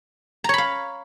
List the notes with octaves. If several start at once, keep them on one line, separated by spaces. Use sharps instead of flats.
C#5 F5 A#5 B5